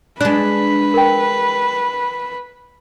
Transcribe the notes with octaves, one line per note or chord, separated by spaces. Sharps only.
G#3 D4 B4 F#6
A#4 G5